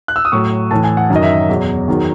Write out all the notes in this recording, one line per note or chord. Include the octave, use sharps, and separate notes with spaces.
F#6
E6
D#6
A2 F#3 C#6
A2 E3 A5
G#5
F#5
F#2 D#3 F#3
D#5
E5
E2 B2 F#3
E2 D#3 F#3